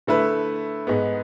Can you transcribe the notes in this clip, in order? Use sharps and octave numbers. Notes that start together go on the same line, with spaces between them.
D3 A3 E4 B4
G#2 G#3 B3